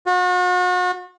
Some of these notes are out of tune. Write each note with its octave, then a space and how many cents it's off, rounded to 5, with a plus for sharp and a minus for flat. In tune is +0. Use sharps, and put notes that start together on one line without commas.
F#4 -40